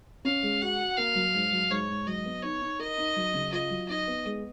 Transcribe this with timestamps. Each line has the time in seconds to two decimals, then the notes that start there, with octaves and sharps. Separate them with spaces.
0.25 C#4 F5
0.43 G#3
0.61 F#4 F#5
0.80 F#4
0.97 A#3 F5
1.15 F#3
1.34 G#2
1.52 F#3
1.70 G#2 C#5
1.88 G#2
2.06 F#3 D#5
2.25 B3
2.43 D#4 C#5
2.62 D#4
2.79 A#4 D#5
2.98 D#4
3.16 F#3
3.34 C#3
3.52 F4 D#5
3.70 F#3
3.89 D#4 D#5
4.07 B3
4.25 G#3